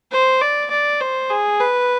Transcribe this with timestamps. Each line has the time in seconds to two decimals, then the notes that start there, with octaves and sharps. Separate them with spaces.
0.11 C5
0.41 D5
0.70 D5
1.00 C5
1.30 G#4
1.60 B4